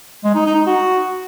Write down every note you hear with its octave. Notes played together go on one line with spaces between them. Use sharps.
G#3
D#4
D#4
D#4
F#4